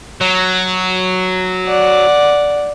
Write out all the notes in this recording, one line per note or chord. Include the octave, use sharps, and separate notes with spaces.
F#3
D5 F#5